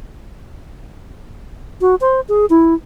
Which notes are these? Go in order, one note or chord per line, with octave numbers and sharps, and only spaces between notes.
F#4
C5
G#4
E4